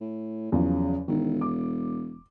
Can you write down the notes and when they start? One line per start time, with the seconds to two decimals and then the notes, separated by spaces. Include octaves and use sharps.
0.01 A2
0.52 E2 C#3 F3 F#3
1.08 E1 D#3
1.41 D6